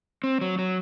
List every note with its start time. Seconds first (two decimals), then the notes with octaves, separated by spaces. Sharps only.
0.24 C4
0.41 F#3
0.59 F#3